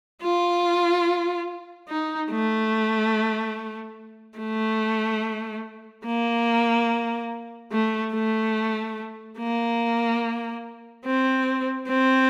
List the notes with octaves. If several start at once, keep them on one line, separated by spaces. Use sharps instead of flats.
F4
D#4
A3
A3
A#3
A3
A3
A#3
C4
C4